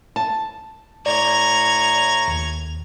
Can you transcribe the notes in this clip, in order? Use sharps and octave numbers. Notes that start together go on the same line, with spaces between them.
A5
A2 D5 A#5 C#6 G#6 F7
D#2